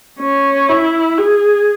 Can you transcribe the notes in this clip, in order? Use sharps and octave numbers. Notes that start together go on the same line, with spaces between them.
C#4
E4
G#4